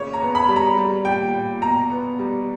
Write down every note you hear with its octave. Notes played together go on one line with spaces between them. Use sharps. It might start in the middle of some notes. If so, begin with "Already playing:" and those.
Already playing: A#2 C#3 A#3 C#5
A#5
B3
B5
G3
A#5
G3
A#2 G5
A#2
B2 A#5
B3
G3